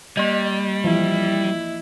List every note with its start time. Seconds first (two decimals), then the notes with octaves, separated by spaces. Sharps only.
0.17 G3 A#3 D#5
0.84 E3 F3 E4